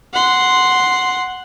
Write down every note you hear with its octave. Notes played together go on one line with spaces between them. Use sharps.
F#5 C6